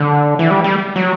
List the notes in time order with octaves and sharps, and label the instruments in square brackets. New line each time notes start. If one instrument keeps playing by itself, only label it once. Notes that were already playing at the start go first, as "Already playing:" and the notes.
Already playing: [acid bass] D3
E3
G3
G3
F#3